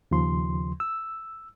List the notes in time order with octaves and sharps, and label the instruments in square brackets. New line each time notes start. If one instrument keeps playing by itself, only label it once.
[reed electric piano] D#2 C#3 F3 C6
E6